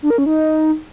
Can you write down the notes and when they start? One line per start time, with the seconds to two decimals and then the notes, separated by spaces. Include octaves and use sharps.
0.02 D4
0.10 A#4
0.18 C#4
0.26 D#4